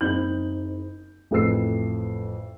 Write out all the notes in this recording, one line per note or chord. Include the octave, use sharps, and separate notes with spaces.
F#1 C4 D#4 B5 G6 F#7
A1 F2 A4 B4 E6 C7